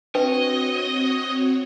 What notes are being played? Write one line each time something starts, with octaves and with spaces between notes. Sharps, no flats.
C4 D4 F#4 B4 C#5 D#5 G5